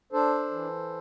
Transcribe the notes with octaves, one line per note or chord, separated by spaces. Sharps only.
D4 A4 C5
E3